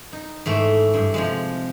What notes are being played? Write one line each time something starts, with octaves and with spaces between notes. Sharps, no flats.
D#4
G#2 E3 A3
G2
C3 F3 G#3